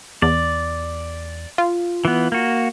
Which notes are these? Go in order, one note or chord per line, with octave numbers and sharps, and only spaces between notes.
E2 D5
F4
E3 B3
A#3 F#4